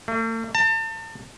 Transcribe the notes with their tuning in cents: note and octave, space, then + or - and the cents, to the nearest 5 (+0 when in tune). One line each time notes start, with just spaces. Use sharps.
A3 +45
A5 +35